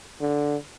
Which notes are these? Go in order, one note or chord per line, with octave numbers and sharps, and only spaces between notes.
D3